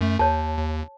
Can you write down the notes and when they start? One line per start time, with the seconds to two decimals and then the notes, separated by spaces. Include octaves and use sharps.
0.01 F#2 A3
0.19 D#2 C#5 A5
0.58 D#2